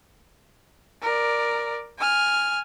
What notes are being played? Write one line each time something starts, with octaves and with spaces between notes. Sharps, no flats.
A#4 D5
G#5 F6